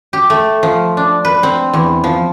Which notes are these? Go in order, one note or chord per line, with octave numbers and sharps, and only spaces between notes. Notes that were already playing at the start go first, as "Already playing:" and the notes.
G4
A3
F3
D4
B4
C4
E2
F3